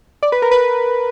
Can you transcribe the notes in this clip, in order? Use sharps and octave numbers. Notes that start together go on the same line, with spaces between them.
D5
B4
A#4
B4